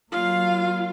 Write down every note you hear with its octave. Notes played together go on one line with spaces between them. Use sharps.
F#3 A#3 F4 F5